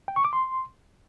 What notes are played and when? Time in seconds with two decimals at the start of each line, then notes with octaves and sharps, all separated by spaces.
0.08 G5
0.16 C#6
0.25 D6
0.33 C6